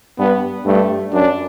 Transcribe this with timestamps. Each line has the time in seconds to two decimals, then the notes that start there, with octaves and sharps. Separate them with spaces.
0.19 G2 B3
0.66 G2 A3
1.13 F#2 D4